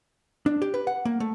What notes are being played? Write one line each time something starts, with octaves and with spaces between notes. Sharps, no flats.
D4
G4
B4
F#5
A#3
A3